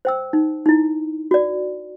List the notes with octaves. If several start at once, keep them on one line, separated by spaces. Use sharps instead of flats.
C5 G5 E6
D#4
D#4 E4
F#4 D5